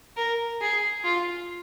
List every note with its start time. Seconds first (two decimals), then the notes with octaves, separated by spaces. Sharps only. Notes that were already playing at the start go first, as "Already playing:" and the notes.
0.17 A#4
0.61 G#4
1.04 F4